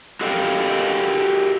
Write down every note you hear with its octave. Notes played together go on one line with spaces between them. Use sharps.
F#4 G4 A4 D#5 F5 G5